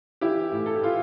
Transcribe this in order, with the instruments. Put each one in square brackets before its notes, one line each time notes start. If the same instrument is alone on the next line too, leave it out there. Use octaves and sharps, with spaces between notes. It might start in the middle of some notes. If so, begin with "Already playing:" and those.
[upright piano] E3 E4 G4
A2
A4
G4
E3 F4